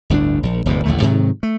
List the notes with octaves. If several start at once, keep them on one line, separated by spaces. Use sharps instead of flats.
G1 D2 A2 D4
A#1
E1 D2 G2 C3
A1 D#2 D3 A3
G#2 C3 D#3 F#3
A3